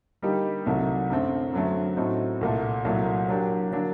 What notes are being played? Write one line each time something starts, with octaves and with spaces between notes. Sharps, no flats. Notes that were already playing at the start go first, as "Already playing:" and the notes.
D3 G3 A#3 D#4 G4
C2 C3 D#3 F#3 A3
F#2 D3 A3 C4
F#2 D3 F#3 A3 C4
A2 A3 C4 D#4 F#4
C2 A#2 A3
C2 A#2 F#3 A3
F#3 A#3 D4 G4
D3 F#3 A#3 D4